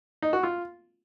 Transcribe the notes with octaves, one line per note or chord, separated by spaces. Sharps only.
D#4
F#4
F4